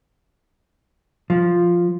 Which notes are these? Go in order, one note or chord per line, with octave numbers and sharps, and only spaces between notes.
F3